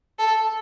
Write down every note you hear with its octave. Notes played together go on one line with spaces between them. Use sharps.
A4